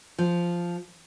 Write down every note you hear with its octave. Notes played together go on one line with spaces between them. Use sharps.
F3